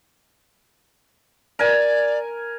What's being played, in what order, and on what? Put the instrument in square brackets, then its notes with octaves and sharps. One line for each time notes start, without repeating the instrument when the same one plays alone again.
[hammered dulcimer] A#4 G#5 [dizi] D5